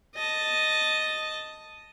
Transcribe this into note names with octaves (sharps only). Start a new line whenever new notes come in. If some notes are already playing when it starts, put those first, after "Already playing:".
D#5 A5